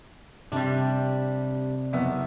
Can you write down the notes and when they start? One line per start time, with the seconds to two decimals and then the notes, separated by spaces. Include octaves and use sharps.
0.52 C3 G3 D4
1.93 F#1 B3 E5